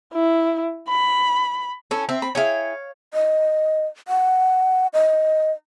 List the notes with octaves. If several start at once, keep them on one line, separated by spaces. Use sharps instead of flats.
E4
B5
C#4 E4 A4
C4 E5
B5
E4 G#4 C#5 F5 G5
D#5
F#5
D#5